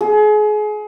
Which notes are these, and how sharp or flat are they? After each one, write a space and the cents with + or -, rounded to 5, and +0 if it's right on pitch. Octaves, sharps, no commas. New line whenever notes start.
G#4 +30